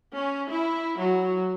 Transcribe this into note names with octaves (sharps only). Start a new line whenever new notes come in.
C#4
E4
F#3